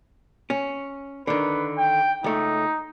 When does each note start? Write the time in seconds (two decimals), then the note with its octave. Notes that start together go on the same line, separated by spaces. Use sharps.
0.50 C#4
1.27 D3 D#3 B4
1.78 G5
2.24 C#2 A3 D#4